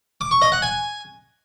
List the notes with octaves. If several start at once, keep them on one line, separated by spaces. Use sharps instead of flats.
D6
C#6
D#5
F#5
G#5